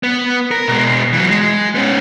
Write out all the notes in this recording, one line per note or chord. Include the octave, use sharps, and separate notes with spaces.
B3
A#4
B2 G#3
E3 F#3
G#3
B3 C#4